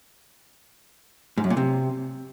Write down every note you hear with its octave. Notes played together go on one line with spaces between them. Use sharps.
G#2
F#2
A#2
C3